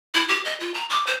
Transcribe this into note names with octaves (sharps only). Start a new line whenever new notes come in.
E4
G4
D#5
F4
A#5
D6
C5